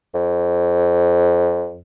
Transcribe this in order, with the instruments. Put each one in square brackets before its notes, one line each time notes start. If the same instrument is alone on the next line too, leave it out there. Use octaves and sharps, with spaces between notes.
[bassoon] F2